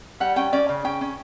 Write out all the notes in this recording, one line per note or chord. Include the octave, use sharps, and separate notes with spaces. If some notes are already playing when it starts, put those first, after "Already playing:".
G3 F#5
C#4 G5
C#4 D5
C#3
C#4 G5
C#4